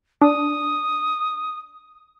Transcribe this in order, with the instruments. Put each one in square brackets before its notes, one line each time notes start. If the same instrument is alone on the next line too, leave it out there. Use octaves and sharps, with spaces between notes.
[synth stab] D4 [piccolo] D#6